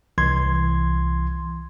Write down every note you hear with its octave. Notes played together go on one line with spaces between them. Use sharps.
C2 E3 C6 G#6